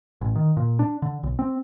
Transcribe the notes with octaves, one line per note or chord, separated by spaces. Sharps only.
A1
D#3
A#2
D4
D3
B1
C4